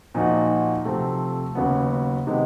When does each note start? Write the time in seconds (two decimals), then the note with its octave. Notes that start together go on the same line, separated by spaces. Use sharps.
0.15 A#2 F3 A#3 D#4 F#4
0.85 C3 F3 A3 C4
1.55 D#2 C#3 F#3 B3
2.27 C3 D#3 G#3 B3